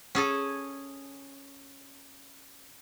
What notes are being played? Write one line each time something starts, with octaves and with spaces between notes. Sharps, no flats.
C#4 G#4 A4